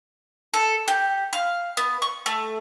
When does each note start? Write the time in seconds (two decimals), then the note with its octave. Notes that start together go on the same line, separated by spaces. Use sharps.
0.54 A4
0.88 G4
1.33 F5
1.77 B3
2.02 C#6
2.26 A3